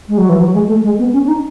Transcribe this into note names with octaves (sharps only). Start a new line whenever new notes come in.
G#3
F#3
E3
F#3
G#3
A3
G#3
B3
C#4
C#4
D#4